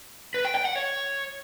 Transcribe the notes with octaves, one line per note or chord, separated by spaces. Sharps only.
B4
G5
G5
F#5
C#5